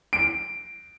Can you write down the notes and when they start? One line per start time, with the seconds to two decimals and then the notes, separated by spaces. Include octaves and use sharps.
0.13 D7